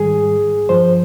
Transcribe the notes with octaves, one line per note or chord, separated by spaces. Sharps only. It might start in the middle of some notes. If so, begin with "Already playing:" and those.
Already playing: G#2 D#3 G3 G#4
G2 F3 C5